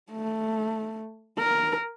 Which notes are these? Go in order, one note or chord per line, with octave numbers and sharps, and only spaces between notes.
A3
A#4